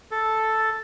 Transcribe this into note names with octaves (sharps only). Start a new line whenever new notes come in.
A4